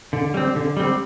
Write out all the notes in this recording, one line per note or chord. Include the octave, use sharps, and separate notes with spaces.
D3
G3 C4
D3
G3 C4